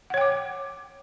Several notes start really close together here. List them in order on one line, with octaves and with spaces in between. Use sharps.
F#5 C#5 G5 D6